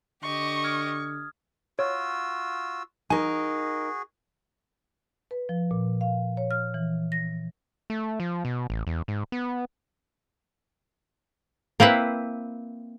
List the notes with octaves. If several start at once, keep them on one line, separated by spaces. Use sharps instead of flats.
D3 G4 D#5 C#6
D#6 F6 G#6
F4 F#4 C#5 E6
D#4 F#4 G#4 A#4 G#5
B4
F3
A#2
F5
C#5
F6
E3
A#6
A3
F3
B2
A1
E2
G#2
B3
A#3 C4 E4 B4